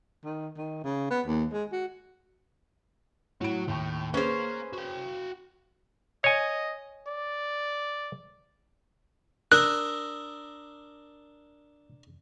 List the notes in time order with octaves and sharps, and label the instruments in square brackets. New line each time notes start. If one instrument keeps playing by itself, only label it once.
[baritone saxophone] D#3
D#3
C#3
B3
D#2
G#3
F#4
[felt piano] A2 D7 [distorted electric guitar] F#4 C#5
[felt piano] D#2 G5 C#6 [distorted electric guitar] A2
[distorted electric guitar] A#3 [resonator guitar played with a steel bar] C#4 C5 [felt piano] G#4 B4
[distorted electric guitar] F#4 G5
[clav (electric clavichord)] C#5 G#5 [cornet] D#5
[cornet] D5
[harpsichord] D4 A#4 [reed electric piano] D#6 E6 [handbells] F#6